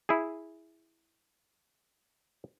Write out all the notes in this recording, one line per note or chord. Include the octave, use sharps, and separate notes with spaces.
E4 G#4